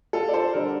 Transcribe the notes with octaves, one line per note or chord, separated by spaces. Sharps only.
F4 A4
D5
A4 C5
D3 G3 A#4 D5